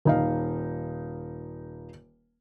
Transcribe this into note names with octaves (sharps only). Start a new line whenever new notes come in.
D#1 D#4 F5